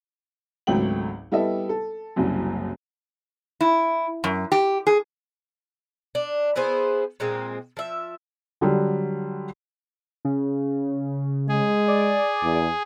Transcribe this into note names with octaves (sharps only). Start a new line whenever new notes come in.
G#1 C#2 F#3 A3 G5 F#7
G3 B3 E4 A4 D#5 E5
A4
F#1 C2 F#2
E4
F#2
G4
G#4
D4
B3 E4 G#4 C5
A#2 G#3 A#3 C4
F3 E5
D3 F#3 G3
C#3
G#3 G#4
D5
E2